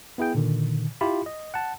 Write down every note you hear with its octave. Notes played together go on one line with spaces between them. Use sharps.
B3 E4 G#4 G5
A#2 D3 D#3
E4 F4 G4 B5
D#5
F#5 A5